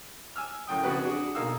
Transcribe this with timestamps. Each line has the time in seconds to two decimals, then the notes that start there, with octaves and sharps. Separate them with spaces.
0.36 G#5 E6 F6
0.67 F#2 A2 G5 D#6
0.84 F2 C#3 F#4 B4
1.04 D4 F#4 G#4
1.35 B1 A#3 D#4 F5 E6